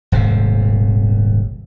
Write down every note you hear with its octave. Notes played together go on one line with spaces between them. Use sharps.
D#1 G#1 C3